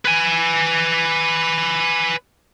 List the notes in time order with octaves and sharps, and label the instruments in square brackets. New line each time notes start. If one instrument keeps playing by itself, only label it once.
[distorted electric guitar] B4 G#5